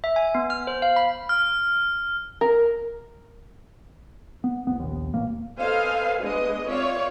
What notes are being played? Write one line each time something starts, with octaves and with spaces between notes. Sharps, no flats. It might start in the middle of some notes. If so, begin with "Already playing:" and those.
E5
G#5
B3
F6
C5
F5
B5
F6
A#4
B3
C2 F#2 B3
A#1 D#2
D#1 A1 A#3
A4 B4 C5 D#5 F5 G#5
G#3 B3 D4 B4 D#5
C4 F4 C#5 D5 E5 F5